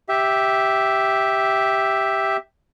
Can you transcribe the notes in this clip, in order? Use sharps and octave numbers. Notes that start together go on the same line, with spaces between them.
G4 E5